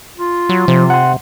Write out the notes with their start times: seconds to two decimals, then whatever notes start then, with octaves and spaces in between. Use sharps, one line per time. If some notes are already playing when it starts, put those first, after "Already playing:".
0.17 F4
0.49 F#3
0.68 C3 F3
0.90 F#5 C6